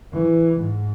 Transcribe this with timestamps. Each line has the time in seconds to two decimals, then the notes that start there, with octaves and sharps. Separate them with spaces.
0.13 E3
0.61 G#2